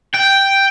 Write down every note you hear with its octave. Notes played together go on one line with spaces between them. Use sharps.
G5